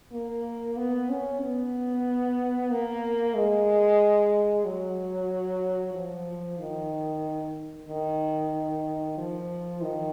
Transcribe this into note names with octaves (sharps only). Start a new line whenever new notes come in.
A#3
B3
C#4
B3
A#3
G#3
F#3
F3
D#3
D#3
F3
D#3